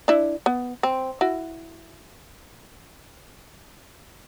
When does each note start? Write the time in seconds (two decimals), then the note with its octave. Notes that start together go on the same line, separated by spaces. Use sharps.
0.08 D4 E4
0.46 B3
0.83 C4
1.21 E4 F#4